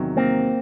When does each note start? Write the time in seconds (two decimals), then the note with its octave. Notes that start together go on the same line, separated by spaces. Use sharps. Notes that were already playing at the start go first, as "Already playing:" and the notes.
Already playing: E2 C3 D#3 F#3
0.17 A#3 C4